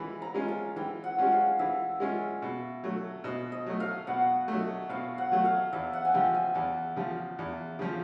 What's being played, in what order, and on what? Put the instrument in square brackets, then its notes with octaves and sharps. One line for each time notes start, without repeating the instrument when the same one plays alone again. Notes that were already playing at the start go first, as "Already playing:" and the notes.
Already playing: [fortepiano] E3 G#3 C#4 F4 [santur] B5
[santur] A#5
[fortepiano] G#3 C#4 F4
[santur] A5
[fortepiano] E3 [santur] G5
[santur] F#5
[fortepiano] G#3 C#4 F4
[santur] F5
[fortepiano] E3 [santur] E5
[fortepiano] G#3 C#4 F4
B2
F#3 A3
[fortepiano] B2 [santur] D#5
[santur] D#5
[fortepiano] F#3 A3
[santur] F5
[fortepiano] B2 [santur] F#5
[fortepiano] F#3 A3
[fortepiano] B2 [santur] F5
[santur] F#5
[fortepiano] F#3 A3
[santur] F5
[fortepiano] E2 [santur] E5
[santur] F#5
G#5
[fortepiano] C#3 F3 [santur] G5
[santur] G#5
[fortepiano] E2 [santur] A5
[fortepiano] C#3 F3
E2
C#3 F3